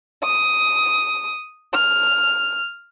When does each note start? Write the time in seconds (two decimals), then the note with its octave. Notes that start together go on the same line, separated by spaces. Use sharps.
0.24 D#6
1.75 F6